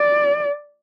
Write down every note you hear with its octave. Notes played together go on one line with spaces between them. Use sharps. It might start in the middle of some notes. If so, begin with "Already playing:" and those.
Already playing: D5